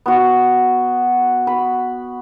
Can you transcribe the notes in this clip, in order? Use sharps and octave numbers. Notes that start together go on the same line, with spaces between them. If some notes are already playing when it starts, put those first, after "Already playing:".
B3 F#4
B5